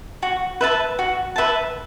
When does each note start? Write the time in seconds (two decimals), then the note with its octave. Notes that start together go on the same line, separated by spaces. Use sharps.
0.23 F#4
0.61 B4 E5 A5
0.99 F#4
1.36 B4 E5 A5